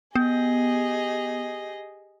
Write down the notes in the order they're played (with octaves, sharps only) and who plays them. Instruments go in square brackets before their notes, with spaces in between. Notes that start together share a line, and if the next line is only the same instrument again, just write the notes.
[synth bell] B3 [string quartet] G4 G#4 D#5